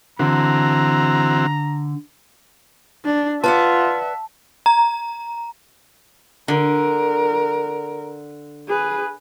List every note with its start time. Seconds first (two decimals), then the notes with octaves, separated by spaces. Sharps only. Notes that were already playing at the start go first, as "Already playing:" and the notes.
0.19 D3 E3 C4 F#4 A#5
3.05 D4
3.44 F4 B4 D5 E5 F#5 A5
4.66 A#5
6.48 D3 A#4
8.68 G#4 B4